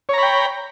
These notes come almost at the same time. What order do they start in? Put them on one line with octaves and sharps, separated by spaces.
C#5 A#5 B5 G5